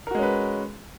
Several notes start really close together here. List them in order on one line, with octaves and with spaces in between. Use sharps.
A#4 F#4 G#3 C#4 B4